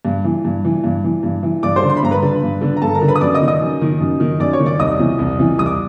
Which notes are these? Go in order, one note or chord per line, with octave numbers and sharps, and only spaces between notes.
G2
E3
G2
E3
G2
E3
G2
E3
G2 D5 D6
C5 C6
D3
C6
B5
G2 A#5
B4 B5
D3
G2
D3
A#5
G2 A4 A5
A#4 A#5
D3
B4 B5
D#6
F#2 D5 D6
D#5 D#6
D#3
D#5 D#6
F#2
D#3
F#2
D#3
F#2 D5 D6
C#5 C#6
D#3
D5 D6
C2 D#5 D#6
C3 E3
C2
C3 E3
C2 D#6
D6